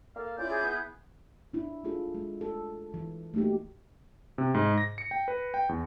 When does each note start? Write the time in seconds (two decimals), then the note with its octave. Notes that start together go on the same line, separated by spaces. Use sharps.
0.16 A#3 A4 F5
0.38 C#4 E4 F4 D5 G6
0.49 G#4
0.62 B3
1.53 D4 E4
1.84 G#3 D4 F4 G#4 A4
2.14 G#3
2.41 A4
2.94 E3
3.34 A3 A#3 D#4 F#4 G4
4.38 C3
4.54 G#2
4.78 A#6
4.98 C#7
5.11 G5
5.28 B4
5.54 G5
5.69 E2